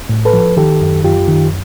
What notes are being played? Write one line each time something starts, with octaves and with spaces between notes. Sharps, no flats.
A2
A4 B4
F3
D#3 G4 A4
F#2
F#2 F4 G4
D#3